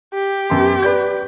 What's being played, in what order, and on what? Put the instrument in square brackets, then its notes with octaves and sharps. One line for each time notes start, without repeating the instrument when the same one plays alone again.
[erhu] G4
[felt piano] F#2 B3 C6
B4 D5 G6